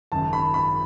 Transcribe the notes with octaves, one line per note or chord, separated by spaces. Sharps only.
G#1 F#2 C#3 A5
B5
B5